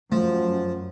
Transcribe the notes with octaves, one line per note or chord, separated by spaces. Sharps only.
F#2 F3 A3